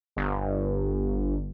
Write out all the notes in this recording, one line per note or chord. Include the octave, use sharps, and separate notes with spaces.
G1